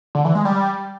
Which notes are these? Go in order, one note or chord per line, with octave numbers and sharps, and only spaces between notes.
D3
E3
G#3
G3